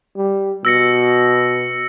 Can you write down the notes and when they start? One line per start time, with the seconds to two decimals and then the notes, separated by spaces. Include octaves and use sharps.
0.16 G3
0.65 B2 E6 A#6 C#7